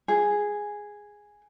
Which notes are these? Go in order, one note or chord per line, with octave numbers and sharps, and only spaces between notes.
G#4